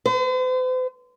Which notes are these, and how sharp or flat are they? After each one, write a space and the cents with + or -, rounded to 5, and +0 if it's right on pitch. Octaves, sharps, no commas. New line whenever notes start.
C5 -45